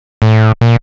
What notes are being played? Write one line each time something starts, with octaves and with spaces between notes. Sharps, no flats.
A2
A#2